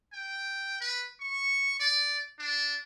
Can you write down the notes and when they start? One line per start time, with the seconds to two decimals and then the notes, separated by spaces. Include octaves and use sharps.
0.13 G5
0.81 B4
1.20 C#6
1.80 D5
2.39 D4